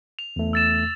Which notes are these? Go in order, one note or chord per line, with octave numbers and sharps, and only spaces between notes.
F7
E2 A3
E6 A6 E7